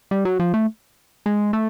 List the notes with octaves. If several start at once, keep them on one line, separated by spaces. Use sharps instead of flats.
G3
F#3
F3
A3
G#3
A3